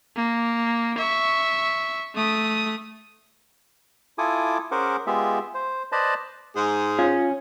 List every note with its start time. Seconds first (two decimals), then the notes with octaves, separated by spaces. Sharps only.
0.16 A#3
0.98 E5 C#6
2.16 A3 D#6
4.18 E4 F4 A4 G#5 D6 D#6
4.72 C#4 G#4 A#4 C5 F#5 D6
5.07 G#3 B3 F4 G4 G#4 E5
5.54 C5
5.92 B4 C5 D5 D#5 A5 B5
6.55 G#2 G#4
6.99 C#4 F4